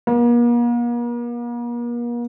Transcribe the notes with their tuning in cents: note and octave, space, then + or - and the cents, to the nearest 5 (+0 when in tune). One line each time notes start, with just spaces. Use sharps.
A#3 +40